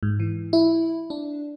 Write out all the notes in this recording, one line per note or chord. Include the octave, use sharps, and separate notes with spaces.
G#2
E3
E4
D4